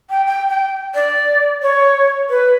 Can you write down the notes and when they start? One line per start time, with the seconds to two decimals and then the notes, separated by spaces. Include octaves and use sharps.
0.10 G5
0.26 G5
0.49 G5
0.95 D5
1.62 C#5
2.30 B4